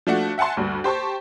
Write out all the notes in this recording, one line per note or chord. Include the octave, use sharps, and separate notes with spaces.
F3 A3 D4 F#4
E5 F#5 G#5 A5 C6
D2 G2
G4 C5 A5 C#6